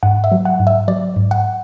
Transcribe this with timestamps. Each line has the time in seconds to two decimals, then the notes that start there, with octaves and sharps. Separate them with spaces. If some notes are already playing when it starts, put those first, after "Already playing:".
0.03 G#2 F#5
0.24 E5
0.32 F#3
0.45 F#5
0.59 G#2
0.67 E5
0.88 F#3 D5
1.16 G#2
1.31 F#5